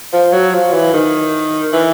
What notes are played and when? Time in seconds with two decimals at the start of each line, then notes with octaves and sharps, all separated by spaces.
0.13 F3
0.33 F#3
0.54 F3
0.73 E3
0.93 D#3
1.73 E3